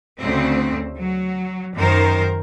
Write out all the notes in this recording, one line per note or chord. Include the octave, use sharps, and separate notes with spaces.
D2 C#3 C4
F#3
F#2 D#3 A#4 C5